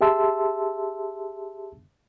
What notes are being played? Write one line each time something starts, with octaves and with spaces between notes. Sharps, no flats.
G4 G#4 E5 A5 C6 E6